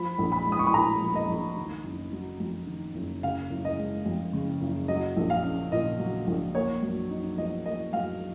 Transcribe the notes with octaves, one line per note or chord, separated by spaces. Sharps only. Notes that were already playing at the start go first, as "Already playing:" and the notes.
Already playing: F3 B5
A#1
B5
G#3
D#6
C#6
B5
A#2 A#5
F3
D#5
A#1
D#3
F#1
F#3
F2
D#3
F#1
C#3 F5
F#1
D#5
G#3
F2
C#3
F#1
F#3 D#5
A#1
F5
C#4
A#2 D#5
F#3
A#1
A#3 C#5
F#2
D#4
F3 D#5
A#3 D#5
F#2 F5